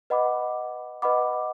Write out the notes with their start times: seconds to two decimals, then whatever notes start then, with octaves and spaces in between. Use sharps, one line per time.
0.10 B4 D#5 F#5 B5 D6
1.02 B4 D#5 F#5 B5 D6